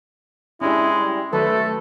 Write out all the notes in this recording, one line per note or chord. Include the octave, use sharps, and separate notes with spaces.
G#3 C#4 D4 E4 G4
G3
D#3 F#3 A3 A4 B4